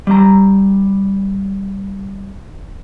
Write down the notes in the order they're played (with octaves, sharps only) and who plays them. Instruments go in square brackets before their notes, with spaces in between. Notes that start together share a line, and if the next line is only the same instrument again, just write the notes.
[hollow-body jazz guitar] G3 A#5